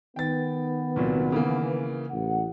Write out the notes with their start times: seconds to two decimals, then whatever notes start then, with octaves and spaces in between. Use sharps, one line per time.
0.16 D#3 B3 G5 A6
0.96 C2 A#2 F#3
1.32 C#3 E3 A#3
2.10 A1 F#5